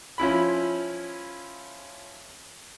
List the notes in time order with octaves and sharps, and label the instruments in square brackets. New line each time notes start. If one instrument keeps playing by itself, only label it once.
[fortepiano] F3 C#4 E4 B5